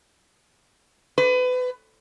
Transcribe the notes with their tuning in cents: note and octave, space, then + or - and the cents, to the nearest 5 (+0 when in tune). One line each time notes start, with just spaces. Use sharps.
B4 +30